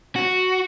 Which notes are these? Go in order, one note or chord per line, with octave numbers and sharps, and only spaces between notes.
F#4